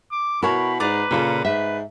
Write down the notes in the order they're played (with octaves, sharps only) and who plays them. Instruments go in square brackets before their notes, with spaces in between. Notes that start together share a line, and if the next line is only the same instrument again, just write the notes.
[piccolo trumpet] D6
[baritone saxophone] B2 [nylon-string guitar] E4 F#4 [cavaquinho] A#4 C#5 [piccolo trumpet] B5
[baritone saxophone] G#2 [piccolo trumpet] B4 [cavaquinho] D5 A#5 D6
[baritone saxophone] A#2 [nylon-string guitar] C#3 F4 A4
[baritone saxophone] G#2 [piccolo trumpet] B4 [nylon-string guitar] E5